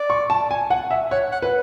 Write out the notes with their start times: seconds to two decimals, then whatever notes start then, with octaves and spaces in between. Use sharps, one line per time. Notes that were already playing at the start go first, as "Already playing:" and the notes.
Already playing: D5
0.10 C#6
0.30 A5
0.51 G#5
0.70 F#5
0.91 E5
1.11 C#5 F#5
1.32 F#5
1.42 B4